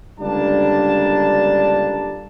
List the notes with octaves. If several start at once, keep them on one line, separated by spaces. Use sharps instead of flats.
C#2 D3 G3 A#3 D4 A5